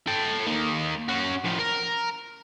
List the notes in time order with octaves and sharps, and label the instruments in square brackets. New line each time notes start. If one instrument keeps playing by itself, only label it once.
[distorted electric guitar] A4 G5
A#3 D#4
C#4 F#4
A2 F3
A#4